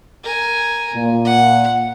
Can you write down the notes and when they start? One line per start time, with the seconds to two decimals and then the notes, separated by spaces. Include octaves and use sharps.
0.23 A#4 G#5
0.95 A#2
1.25 F#5